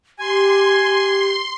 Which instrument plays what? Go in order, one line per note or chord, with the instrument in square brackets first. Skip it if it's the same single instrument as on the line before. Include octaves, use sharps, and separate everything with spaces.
[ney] G4 [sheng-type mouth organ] G#5 [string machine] C6